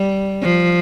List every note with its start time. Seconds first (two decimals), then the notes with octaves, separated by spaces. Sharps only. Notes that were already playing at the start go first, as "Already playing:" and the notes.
Already playing: G3
0.43 F3